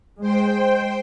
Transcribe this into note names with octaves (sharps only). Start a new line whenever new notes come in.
G#3 C5 G5